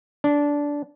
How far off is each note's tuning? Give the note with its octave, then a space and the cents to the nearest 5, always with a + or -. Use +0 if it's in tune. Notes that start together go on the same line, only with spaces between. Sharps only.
D4 -15